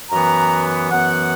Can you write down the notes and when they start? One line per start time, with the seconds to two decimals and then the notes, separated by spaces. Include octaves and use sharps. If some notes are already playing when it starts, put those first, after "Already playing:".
0.10 F#2 E3 B3 A#5
0.90 F#2 E3 B3 F#5